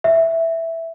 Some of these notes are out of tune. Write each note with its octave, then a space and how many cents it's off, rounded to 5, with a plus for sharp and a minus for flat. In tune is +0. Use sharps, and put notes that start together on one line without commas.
E5 +0